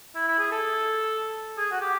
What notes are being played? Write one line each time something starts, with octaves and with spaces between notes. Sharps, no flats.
E4
E4
G#4
A4
G#4
F#4
G4